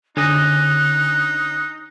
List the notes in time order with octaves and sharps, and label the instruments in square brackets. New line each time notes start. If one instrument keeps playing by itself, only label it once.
[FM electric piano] D3 [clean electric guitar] C#4 G#4 D#5 [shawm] D#4 [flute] F#6